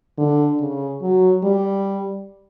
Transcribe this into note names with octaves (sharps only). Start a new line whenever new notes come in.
D3
C#3
F#3
G3